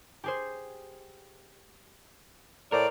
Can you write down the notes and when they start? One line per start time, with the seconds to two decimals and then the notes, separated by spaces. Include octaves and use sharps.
0.24 G4 G#4 C5
2.72 A2 A4 A#4 C5 D5